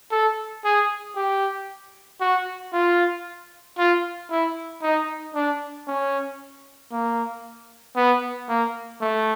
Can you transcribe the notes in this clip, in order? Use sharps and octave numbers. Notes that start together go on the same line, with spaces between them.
A4
G#4
G4
F#4
F4
F4
E4
D#4
D4
C#4
A#3
B3
A#3
A3